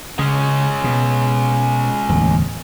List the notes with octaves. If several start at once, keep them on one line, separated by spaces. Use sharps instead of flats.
C#3 G#3 C#4
B2
D1 E2